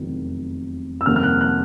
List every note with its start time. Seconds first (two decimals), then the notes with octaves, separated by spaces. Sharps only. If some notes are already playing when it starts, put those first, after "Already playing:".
Already playing: F1 E2 C3 D#3 F#3
1.01 E6
1.06 F2 C3 D#3 G3 A#3 F6
1.16 F6
1.23 F#6
1.41 F#6